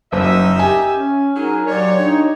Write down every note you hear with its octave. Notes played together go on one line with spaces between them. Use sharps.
F#1 D#4 F#4 A#4 E5
G4 G#5
C#4
F#3 D#4 G#4 A#4
A#2 F#3 G4 C#5 D5
D4 D#4